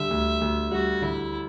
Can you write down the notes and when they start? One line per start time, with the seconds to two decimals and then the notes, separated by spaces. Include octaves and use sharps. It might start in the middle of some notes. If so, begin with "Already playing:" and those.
Already playing: D3 G3 E5
0.11 D2
0.41 D2
0.72 G3 F#4
1.02 D3 E4